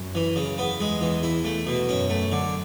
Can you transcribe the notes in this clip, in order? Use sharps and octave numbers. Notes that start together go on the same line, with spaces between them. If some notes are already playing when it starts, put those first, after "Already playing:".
Already playing: F#2
E3
C#3
E2 B3
G#3
E3
E4
A3
B2
F#2 C#4
A3
D3